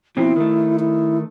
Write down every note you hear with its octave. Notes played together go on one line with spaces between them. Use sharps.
B2 F3 C4 E4
D#3 A3
E4